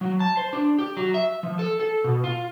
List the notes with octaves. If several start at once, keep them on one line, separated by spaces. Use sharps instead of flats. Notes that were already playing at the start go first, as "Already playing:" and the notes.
F#3
A5
C5
D4
G4
F#3
E5
F3
A4
A4
B2
F4